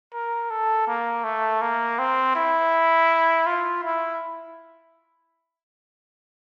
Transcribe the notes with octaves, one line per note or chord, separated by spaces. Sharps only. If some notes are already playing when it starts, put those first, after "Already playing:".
A#4
A4
A#3
A3
A#3
C4
E4
F4
E4